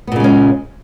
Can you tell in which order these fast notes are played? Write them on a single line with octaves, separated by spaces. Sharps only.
B3 A#2 C#3 G#3 C#4